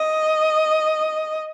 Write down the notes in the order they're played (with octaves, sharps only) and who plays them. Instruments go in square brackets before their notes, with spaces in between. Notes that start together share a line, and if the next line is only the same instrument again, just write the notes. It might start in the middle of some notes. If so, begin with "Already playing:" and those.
Already playing: [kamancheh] D#5